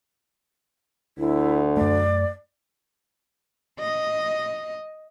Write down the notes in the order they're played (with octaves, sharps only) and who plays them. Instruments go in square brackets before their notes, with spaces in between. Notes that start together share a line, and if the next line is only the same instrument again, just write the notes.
[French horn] D2 [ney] E4
[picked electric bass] F#2 A3 [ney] D5
[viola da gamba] D#5